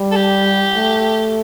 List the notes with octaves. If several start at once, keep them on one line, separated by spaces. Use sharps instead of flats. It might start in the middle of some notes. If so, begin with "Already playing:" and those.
Already playing: G3
A4
G4
A3